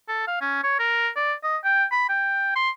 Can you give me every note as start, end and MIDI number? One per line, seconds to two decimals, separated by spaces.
0.08 0.23 69
0.27 0.39 77
0.41 0.62 61
0.63 0.76 73
0.79 1.08 70
1.16 1.33 74
1.43 1.57 75
1.64 1.84 79
1.92 2.07 83
2.09 2.52 79
2.56 2.70 84